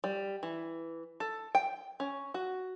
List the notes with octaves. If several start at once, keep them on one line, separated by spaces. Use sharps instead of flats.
G3
E3
A4
G5
C#4
F#4